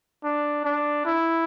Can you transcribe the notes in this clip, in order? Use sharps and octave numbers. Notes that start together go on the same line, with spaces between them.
D4
D4
E4